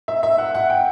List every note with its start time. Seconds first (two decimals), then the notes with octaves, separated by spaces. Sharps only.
0.08 E5
0.23 E5
0.38 F#5
0.55 F#5
0.70 G5